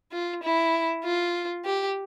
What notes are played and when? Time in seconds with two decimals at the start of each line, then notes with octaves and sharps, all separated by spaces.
0.12 F4
0.43 E4
1.04 F4
1.65 G4